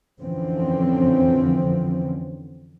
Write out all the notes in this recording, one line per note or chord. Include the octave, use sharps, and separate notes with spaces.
F2 D3 E3 F3 C4 C#4